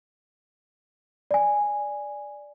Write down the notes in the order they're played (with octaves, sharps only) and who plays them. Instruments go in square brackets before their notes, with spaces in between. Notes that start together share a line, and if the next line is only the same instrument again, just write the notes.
[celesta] D5 G#5